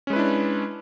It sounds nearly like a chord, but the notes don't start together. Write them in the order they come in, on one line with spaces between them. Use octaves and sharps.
C#4 G#3 B4 E4 D4